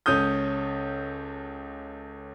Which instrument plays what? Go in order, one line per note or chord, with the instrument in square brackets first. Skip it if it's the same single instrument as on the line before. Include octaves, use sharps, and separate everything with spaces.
[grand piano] C#2 C#4 A4 D#6 G6